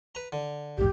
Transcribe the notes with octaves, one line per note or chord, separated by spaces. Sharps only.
B4 A#5
D3
A#1 E2 G#2 G4